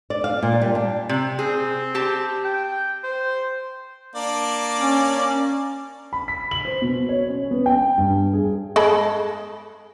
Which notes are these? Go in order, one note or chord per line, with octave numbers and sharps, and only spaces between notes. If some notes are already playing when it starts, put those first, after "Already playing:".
D5
F5
A#2
G3
D4
C3
C4 G#4
G4 A5
G5
C5
A#3 D4 D5
C#4
B5
B6
F#7
C5
B2
C#5
C#4
B3
G5
G2
G#4
G#3 A4 B5